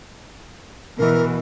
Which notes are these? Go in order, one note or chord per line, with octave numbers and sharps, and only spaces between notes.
B2 E3 A#4